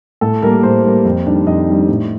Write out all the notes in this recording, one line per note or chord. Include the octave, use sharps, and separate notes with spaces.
A2 A4
G3 A#3 A#4
A2 C5
G3 A#3
F2
D#3 G3 D4
F2 D#5
D#3 G3 D4
A2